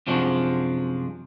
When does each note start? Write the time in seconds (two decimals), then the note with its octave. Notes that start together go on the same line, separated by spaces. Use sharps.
0.07 F#2 C3 F3 G#3 D4 F#4